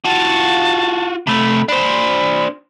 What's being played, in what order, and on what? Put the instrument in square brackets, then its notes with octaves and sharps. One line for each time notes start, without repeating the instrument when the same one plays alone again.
[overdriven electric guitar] F4 F#4 [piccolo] A5
[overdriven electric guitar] C3 A3 [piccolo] B5
[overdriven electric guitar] D4 C5 [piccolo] B5